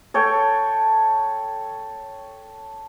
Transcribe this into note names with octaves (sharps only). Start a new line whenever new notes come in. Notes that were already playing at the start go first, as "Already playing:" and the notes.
A4 C#5 G5